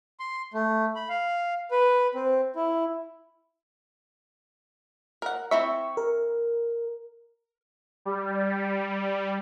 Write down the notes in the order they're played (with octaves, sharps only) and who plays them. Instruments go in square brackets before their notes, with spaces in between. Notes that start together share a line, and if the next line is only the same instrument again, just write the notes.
[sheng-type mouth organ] C6
A3
B5
F5
B4
C4
E4
[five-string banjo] A#4 F#5
[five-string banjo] C4 E4 E5 [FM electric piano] C#6
[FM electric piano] A#4
[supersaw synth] G3